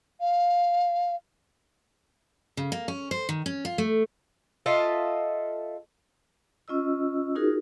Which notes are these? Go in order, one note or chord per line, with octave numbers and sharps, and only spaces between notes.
F5
C#3
A#3
C#4
C5
D#3
C#4
F4
A3
F4 A4 D#5 E5
C#4 F4 D#5 E6
D#4 F4 F#4 G#4 A#4